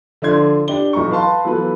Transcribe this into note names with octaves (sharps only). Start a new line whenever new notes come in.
D3 F3 D4 C6 G#6
D4 G4 G7
B1 E3 A#5 C#6
B4 F5 A5 C6
E3 F#3 B3 F4 A4 B4